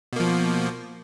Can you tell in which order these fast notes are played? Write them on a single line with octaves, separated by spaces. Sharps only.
B2 A#3 F3